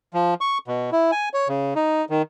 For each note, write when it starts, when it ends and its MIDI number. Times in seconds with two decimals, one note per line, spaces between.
0.14 0.34 53
0.41 0.58 85
0.68 0.90 47
0.92 1.11 64
1.12 1.29 80
1.34 1.48 73
1.48 1.74 49
1.76 2.05 63
2.10 2.22 51